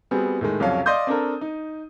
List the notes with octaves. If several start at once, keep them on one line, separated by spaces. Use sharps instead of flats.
G3 B3 C4 F#4 G#4
A2 D#3 G#3
C2 F2 C#3 F#3 C#4 F5
D5 D#5 F5 C6 D#6 G6
C4 D4 A4 A#4
D#4